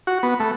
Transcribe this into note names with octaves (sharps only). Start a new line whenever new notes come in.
F#4
B3
A3